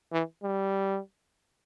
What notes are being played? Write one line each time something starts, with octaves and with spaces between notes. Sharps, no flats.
E3
G3